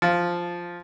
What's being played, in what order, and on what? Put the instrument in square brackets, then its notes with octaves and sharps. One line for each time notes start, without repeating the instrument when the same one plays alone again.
[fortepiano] F3